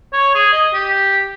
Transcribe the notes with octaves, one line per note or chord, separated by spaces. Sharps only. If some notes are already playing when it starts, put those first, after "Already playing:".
C#5
G#4
D#5
G4